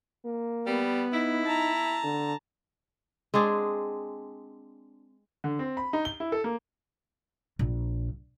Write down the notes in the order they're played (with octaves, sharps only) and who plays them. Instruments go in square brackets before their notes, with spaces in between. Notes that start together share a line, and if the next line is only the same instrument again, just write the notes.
[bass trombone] A#3
[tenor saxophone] G3 [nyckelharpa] B3
[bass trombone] D#4 [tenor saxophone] E4
[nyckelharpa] A5 A#5
[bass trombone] D3
[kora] G#3 C4 D4 G#4
[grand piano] D3
C4
B5
D#4
G7
E4
A4
A#3
[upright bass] A#1